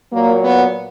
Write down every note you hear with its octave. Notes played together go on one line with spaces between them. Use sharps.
A#2 F#3 A#3
B3